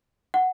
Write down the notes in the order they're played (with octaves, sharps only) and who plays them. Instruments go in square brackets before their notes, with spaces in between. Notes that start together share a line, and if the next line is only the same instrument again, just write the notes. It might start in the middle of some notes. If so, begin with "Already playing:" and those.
[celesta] F#5